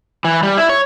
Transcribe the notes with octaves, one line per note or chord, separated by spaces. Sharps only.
E3
G3
E4
C#5